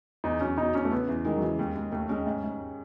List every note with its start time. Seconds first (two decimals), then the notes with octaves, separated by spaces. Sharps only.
0.24 E2 D#4
0.41 F#3 C#4
0.57 B2 D#4
0.74 E2 C#4
0.85 A3
0.91 C#3 B3
1.08 E2 E3
1.25 D#3 G#3
1.36 F#3
1.41 C#3 E3
1.58 D#2 G#3
1.75 D#2 G#3
1.92 D#2 A3
2.09 G#3 C#4
2.27 G#2
2.43 G#2